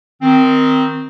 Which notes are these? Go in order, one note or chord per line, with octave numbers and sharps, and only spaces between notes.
D#3 C4